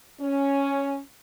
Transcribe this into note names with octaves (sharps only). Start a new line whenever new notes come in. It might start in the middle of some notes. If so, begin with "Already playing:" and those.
C#4